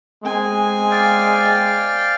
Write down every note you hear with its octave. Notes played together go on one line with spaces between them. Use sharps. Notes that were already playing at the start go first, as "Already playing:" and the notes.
G#3 C4 G#5
D5 F5 G5